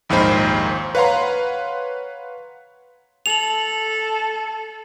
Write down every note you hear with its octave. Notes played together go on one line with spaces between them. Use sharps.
A#1 D#2 G#2 D#4 C5 B5
B4 C#5 F5 F#5 A#5 C6
A4 F7 F#7